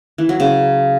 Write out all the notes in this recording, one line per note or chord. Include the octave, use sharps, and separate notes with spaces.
E3
F#3
C#3